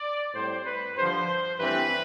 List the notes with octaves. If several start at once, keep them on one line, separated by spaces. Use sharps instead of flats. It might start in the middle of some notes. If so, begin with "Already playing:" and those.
Already playing: D5
A2 G3 C4 C5
B4
G2 D3 F3 C5
G2 E3 A3 C4 B4